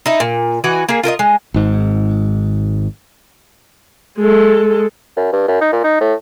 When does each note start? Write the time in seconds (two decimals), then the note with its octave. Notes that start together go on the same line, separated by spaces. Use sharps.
0.06 D#4 E4
0.20 A#2
0.64 E3 F#4 D#5
0.89 A#3 G#4
1.03 F4 A#4 C5 D#5
1.19 G#3
1.54 G#1 G#2
4.18 G#3 A4
5.17 F#2
5.33 G2
5.48 F#2
5.61 D#4
5.72 A#2
5.84 D#4
6.01 A2